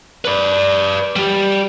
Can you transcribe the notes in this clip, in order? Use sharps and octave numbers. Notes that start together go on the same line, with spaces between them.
B4 D5
G3 G4